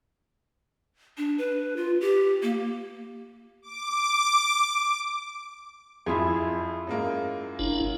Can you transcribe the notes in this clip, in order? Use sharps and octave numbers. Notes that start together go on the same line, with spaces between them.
D4
B4
F4
G4
A#3
D6
F2 E4 F4 G#4
F#2 G#3 A#3
F#1 D4 E4